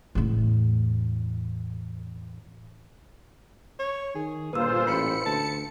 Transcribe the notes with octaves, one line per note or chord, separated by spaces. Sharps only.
E2 A2
C#5
D#3 G#4
G1 A#2 F4 G#4 B4 C5 E6
A1 B5 C#7
D2 A5